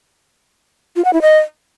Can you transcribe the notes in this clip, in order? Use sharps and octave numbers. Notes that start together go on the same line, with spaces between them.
F4
F#5
E4
D#5